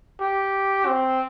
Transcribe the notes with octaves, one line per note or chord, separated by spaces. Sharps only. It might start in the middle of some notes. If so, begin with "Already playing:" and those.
G4
C4